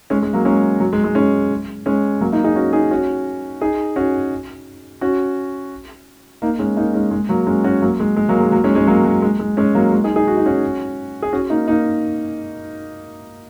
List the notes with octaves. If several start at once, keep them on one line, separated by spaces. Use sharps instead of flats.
G#3 C#4
G#3
F#3 A#3
G#3 C#4
F#3
G#3
G#3
G#3 C#4
G#3 C#4
F#3 A#3
A#3 D#4
D#4 G#4
C#4 F#4
D#4 G#4
C#4 F#4
D#4 G#4
C#4 F#4
C#4 F#4
A#3 D#4
G#3 C#4
A#3 D#4
G#3 C#4
G#3
F#3 A#3
G#3 C#4
C#4 F#4
F#3 A#3
G#3
G#3
F#3 A#3
G#3
F#3 A#3
G#3 C#4
G#3 C#4
F#3 A#3
F#3
G#3
G#3
G#3 C#4
F#3 A#3
G#3
D#4 G#4
D#4 G#4
F#4
D#4
C#4 F#4
G#4
C#4 F#4
A#3 D#4
A#3 D#4